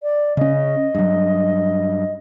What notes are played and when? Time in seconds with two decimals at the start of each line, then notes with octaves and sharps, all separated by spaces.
0.03 D5
0.37 C#3 C#4 D#5
0.95 G2 F#3